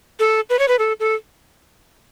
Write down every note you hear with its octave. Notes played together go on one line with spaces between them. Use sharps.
A4
B4
C#5
B4
A4
A4